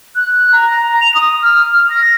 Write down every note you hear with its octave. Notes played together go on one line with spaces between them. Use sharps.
F#6
A#5
F7
D#6
F6
F6
A#6